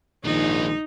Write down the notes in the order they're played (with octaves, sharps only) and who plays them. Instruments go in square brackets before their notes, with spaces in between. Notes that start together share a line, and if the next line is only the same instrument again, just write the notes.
[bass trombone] A#1 [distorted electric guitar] D#3 G#3 [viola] D#4